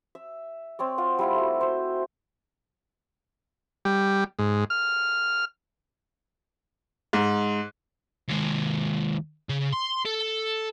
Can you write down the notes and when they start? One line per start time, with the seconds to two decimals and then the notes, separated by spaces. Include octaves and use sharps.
0.15 E5
0.79 C4 C#5 D5
0.98 F4 D5 F#5
1.19 G3 E4 F4
1.35 A3 F#4
1.61 C5 E5
3.85 G3
4.39 G#2
4.70 F6
7.13 G#2
8.28 D#2 G#3
9.49 C#3
9.72 C6
10.05 A4